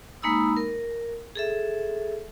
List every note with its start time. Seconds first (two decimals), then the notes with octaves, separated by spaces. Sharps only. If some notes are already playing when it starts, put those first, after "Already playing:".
0.22 G#3 A#3 D#4 B5 D#6 E6
0.57 A#4
1.36 G#4 A4 E5